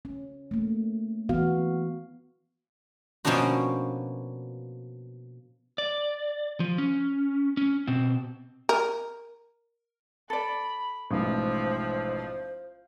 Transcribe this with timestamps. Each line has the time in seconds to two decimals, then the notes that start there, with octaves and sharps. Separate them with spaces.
0.05 C#4
0.51 A3 A#3
1.29 E3 B3 F#4 F5
3.25 B2 F3 A#3 C#4 D4 F#4
5.78 D5
6.60 F3
6.78 C#4
7.57 C#4
7.87 B2 C4
8.69 A#4
10.30 A4 D5 B5
11.11 A1 G#2 B2 F3 C5